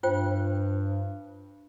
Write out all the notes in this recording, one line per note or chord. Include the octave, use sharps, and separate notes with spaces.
G2 F4 C5 G5